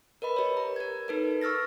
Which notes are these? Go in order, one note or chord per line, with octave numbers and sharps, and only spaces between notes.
A#4 B4 D#5 B5
G4 C#5
A#5
A#4 G#6
D#4 A4 B4
C#6 E6 F6 A6 A#6